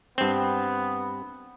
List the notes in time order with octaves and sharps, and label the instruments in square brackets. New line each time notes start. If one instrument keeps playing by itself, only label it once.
[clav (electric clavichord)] G2 C4 [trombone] B3